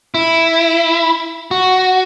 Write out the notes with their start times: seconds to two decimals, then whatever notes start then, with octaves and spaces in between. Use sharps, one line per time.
0.14 E4
1.51 F#4